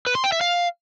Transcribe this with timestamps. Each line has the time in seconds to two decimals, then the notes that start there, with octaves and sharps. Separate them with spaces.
0.07 B4
0.15 C6
0.24 G5
0.32 E5
0.41 F5